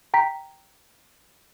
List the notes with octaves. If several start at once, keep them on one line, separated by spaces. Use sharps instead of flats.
G5 A#5 B6